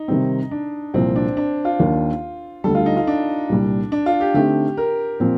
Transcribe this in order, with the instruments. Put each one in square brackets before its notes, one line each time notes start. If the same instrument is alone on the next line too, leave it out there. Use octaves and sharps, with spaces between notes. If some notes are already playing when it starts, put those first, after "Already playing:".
Already playing: [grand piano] D#4
[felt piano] C3 D#3 G3 C4
[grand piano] D4
[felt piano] C2 A#2 F3 [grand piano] C4
[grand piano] D4
D4
F4
[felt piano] D#2 D#3 A#3 D4
[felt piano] D2 D3 G3 [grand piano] A4
[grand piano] F4
D#4
F4
D4
[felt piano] C2 A#2 G3
[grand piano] D4
F4
G4
[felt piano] D3 A3 C4 D#4 [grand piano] G4
[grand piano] A#4
[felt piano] A#2 F3 C4